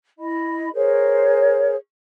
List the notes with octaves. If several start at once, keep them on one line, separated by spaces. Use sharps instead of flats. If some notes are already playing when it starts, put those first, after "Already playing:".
E4 D#5 B5
G#4 A#4 C5 C#5